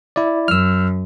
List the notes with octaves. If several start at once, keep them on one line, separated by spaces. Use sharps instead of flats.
E4 D5
F#2 E6 F6